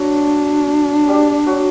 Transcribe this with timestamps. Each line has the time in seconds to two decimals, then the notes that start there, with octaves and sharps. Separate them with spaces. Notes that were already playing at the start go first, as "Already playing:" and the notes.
Already playing: F#3 D4 F#4
1.08 G3 G4
1.46 F#3 F#4